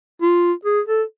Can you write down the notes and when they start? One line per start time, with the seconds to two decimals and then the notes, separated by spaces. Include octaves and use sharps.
0.22 F4
0.65 G#4
0.88 A4